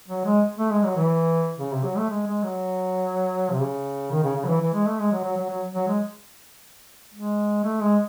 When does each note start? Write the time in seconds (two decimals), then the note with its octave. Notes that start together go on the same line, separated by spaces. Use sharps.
0.09 F#3
0.25 G#3
0.59 A3
0.71 G#3
0.84 F#3
0.97 E3
1.59 C#3
1.73 C3
1.84 F#3
1.98 A3
2.10 G#3
2.27 G#3
2.44 F#3
3.51 C3
3.62 C#3
4.12 D#3
4.24 C#3
4.37 C#3
4.44 F#3
4.49 E3
4.62 E3
4.74 G#3
4.87 A3
5.00 G#3
5.13 F#3
5.25 F#3
5.37 F#3
5.50 F#3
5.75 F#3
5.88 G#3
7.14 G#3
7.64 A3
7.81 G#3